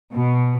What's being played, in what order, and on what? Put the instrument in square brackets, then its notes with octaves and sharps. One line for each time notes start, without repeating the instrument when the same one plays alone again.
[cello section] B2